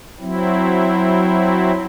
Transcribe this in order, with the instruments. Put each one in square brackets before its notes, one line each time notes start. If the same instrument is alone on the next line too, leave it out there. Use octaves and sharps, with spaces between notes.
[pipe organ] F#3 C4 E4